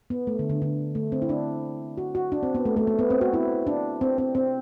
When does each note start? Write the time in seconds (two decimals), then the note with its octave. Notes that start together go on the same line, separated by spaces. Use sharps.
0.10 B3
0.27 A3
0.39 D3
0.50 D3
0.62 D3
0.95 A3
1.12 C4
1.22 E4
1.29 D4
1.98 F#4
2.15 F#4
2.32 D4
2.43 C4
2.55 B3
2.65 A3
2.77 A3
2.87 A3
2.99 B3
3.10 C4
3.21 F#4
3.33 E4
3.67 D4
4.01 C4
4.18 C4
4.35 C4